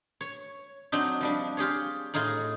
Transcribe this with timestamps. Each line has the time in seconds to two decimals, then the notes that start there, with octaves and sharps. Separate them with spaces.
0.21 C#5
0.92 F#3 C4 D4 D#4
1.21 F3 G3 D4
1.57 F4 G4 G#4 C#5
2.14 A2 D#4 F4 G#4 G#5